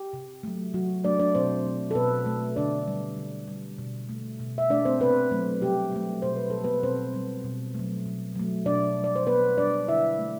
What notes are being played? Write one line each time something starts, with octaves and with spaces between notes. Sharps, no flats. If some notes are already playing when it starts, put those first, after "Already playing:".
Already playing: G4
C3
F#3 A3
C3 F#3 F#4
F#3 A3 D4 D5
D4 D5
B2 C4 C5
A3
A4
B2 B3 B4
A3
D3 D4 D5
G3
D3
G3
B2
A3
B2
E5
A3 D4 D5
C4 C5
C3 B3 B4
F#3 A3
C3 G3 G4
F#3 A3
B2 C5
B4
G3 A4
B3 B4
B2 C4 C5
G3
B2
F#3 A3
B2
F#3 A3
B2 D4 D5
G3
D5
C5
B2 B3 B4
G3 D4 D5
D3 E4 E5
A3